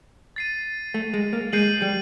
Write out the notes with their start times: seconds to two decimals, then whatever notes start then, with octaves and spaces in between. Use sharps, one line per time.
0.36 A6 C7 D#7
0.94 A3
1.14 G#3
1.33 A#3
1.53 G#3 G6 C7 D#7 F#7
1.82 G3